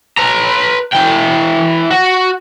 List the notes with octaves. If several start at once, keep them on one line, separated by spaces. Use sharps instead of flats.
B4 A#5
E3 G5
F#4